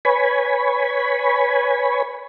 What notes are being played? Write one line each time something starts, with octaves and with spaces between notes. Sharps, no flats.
B4 C#5 G#5 B5